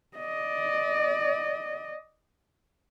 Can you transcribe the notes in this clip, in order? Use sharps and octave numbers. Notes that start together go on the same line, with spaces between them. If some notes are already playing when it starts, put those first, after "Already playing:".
D5 D#5